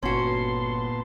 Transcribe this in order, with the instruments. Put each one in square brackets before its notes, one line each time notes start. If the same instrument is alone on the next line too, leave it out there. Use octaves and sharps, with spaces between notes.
[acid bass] G1 [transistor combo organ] A#2 B3 A5 [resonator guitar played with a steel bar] C#4 F#4 [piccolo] C6